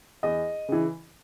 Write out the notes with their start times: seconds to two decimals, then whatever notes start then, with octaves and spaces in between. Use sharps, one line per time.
0.23 E2 D#5
0.68 C#3 E3